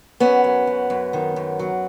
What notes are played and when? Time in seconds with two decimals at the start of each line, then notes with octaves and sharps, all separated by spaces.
0.20 F#2 B3 C#4
0.44 F#2
0.67 F#2
0.90 F#2
1.13 D#3
1.36 F#2
1.59 F#3